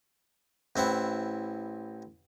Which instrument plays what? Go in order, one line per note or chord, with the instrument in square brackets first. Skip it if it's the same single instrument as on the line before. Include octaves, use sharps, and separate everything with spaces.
[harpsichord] A1 C4 E4 F#5